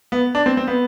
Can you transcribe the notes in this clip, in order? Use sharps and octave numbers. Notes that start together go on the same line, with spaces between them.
B3
D4
C4
C4
B3